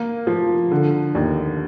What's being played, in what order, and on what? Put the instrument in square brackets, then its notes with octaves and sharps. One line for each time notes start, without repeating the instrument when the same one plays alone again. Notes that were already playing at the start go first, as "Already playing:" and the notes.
Already playing: [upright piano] A#3
F3
D3
D#2